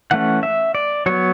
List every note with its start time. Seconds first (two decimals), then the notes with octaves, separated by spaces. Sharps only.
0.11 E3 A3 C#4 F#5
0.43 E5
0.75 D5
1.06 F#3 B3 C#5